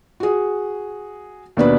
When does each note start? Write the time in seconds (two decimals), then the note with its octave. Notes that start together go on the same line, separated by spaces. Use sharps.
0.20 F#4 G#4
1.57 D#2 B2 D4 B4